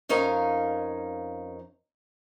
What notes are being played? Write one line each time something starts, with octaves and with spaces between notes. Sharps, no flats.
F2 C#4 D#4 A#4 F5